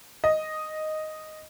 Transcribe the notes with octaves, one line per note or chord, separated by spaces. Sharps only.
D#5